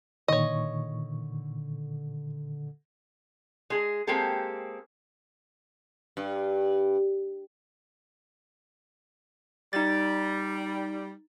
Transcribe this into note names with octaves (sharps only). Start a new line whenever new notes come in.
A#2 D3 D#3 C#5 D#5 C#6
G#3 G#4
G#3 A#3 C4 G4 A4
G2
G3 D#4 A6